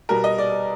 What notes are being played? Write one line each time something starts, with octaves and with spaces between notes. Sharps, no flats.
B2 G3 B3 A#4
D#5
D5